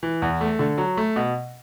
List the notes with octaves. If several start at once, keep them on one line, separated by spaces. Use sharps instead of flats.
E3
E2
A3
D3
F#3
A3
B2